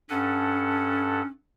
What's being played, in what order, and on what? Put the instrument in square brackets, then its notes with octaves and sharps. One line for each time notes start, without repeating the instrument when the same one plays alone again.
[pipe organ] G2 A4 F#5 [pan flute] C#4